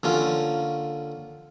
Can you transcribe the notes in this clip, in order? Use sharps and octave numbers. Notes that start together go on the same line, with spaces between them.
D3 A#3 C#4 F4